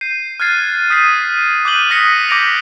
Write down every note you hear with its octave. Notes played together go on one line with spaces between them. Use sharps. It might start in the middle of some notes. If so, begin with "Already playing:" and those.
G6 C7 D#7
F6 F#6 G#6 A6 C7 D#7
D#6 G6 B6 C7 D#7
D6 F#6 G6 D#7 F#7 G7
D#6 A#6 B6 C#7
D6 G6 A#6 B6 D7 F7